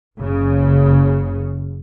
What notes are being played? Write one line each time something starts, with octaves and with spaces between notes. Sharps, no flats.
F#1 C#3